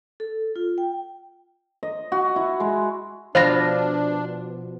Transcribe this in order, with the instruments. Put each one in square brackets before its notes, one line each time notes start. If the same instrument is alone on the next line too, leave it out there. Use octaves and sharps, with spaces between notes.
[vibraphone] A4
F4
G5
[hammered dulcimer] D#5
F#4
E4
G#3
[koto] B2 F3 F4 [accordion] D4 [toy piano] C5 B5 [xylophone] F5 A#6